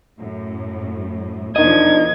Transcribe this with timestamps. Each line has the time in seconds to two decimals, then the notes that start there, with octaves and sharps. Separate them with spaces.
0.18 F#2 A2
1.56 E2 B2 F3 D4 D#4 A#4 D#5 G#6